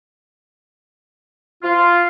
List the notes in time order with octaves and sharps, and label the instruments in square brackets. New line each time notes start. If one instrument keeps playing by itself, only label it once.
[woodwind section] F4